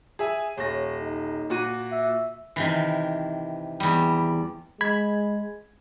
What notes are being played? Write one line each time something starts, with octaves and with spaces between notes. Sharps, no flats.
G#4 E5 G#5
D#1 C#5 A#6
D#4
A#2 F#4 D#7
E5
C3 D#3 E3
E2 G3
G#3 B5 G#6